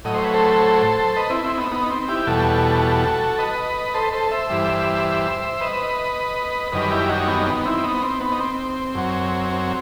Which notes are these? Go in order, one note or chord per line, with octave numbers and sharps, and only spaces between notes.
A2 F#3 D#5
C5
B4
A4 C5
B4 D#5
C4 E4
C4 E4
B3 D#4
B3 D#4
C4
E4 G4
E2 B2 G3 F#4 A4
B4 D#5
A4 C5
A4 C5
C5 E5
G2 E3 G3
B4 D#5
F#2 D#3 G3 B4 D#5
E4 G4
D#4 F#4
B3 D#4
B3 D#4
C4 E4
B3 D#4
C4
B3
D#4
C4
F#2 F#3
C4